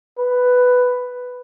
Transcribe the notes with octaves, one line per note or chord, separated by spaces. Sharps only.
B4